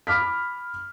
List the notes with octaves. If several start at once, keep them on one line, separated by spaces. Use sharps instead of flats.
B5 D6 F6 B6